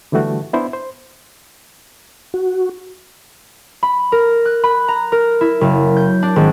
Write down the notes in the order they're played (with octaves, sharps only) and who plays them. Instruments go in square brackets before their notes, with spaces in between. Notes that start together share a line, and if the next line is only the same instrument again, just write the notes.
[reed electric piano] D3 E3 G3 A3 F#4
B3 D4 E4 C5
C5
[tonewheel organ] F#4
[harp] B5
A#4
F#6
B5
A#5
A#4
E4
F#1
G6
D4
G#1